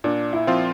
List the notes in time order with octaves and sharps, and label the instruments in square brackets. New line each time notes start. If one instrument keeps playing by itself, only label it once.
[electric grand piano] A#2 [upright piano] D4
[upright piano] E4
[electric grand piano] F3 C4 F4